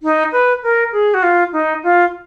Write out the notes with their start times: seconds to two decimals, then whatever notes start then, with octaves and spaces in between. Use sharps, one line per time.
0.03 D#4
0.32 B4
0.63 A#4
0.92 G#4
1.14 F#4
1.23 F4
1.53 D#4
1.84 F4